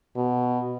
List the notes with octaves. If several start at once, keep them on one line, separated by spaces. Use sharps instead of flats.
B2